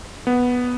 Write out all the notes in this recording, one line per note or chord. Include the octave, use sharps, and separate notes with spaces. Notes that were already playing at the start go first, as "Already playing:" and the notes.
B3